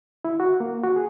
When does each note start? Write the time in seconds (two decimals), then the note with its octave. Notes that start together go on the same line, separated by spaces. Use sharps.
0.25 E4
0.40 F#4
0.60 A#3
0.84 F#4
0.96 G#4